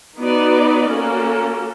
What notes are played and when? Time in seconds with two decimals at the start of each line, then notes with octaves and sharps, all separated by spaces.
0.17 B3 D#4 F#4 B4 D5
0.89 A#3 C#4 F#4 A4